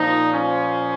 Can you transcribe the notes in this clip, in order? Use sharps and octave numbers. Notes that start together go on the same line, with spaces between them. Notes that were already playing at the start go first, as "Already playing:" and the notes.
Already playing: A#2 F3 D#4
C#4